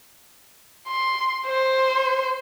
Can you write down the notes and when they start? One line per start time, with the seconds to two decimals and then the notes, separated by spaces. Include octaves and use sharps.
0.88 C6
1.46 C5